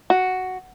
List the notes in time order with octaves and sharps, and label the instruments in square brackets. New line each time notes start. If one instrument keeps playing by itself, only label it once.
[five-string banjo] F#4